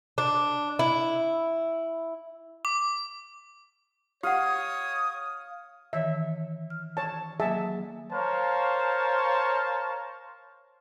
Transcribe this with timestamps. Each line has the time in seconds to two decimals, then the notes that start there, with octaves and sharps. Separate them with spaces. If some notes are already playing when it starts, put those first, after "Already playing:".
0.18 D4
0.79 E4
2.65 D6
4.23 G4 C#5 F5 F#5 D#6
5.93 D#3 E3 C#5 E5
6.70 F6
6.97 C#5 A5
7.40 F#3 A#3 G#4 E5 A5
8.12 A#4 C5 C#5 F5 A5